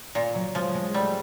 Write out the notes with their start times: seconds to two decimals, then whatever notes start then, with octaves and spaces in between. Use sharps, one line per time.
0.15 A#2
0.35 F#3
0.55 F3 G#3
0.74 G#3
0.94 G3 A3